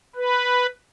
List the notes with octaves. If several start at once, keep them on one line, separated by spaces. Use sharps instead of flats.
B4